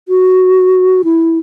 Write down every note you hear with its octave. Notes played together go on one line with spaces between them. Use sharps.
F#4
E4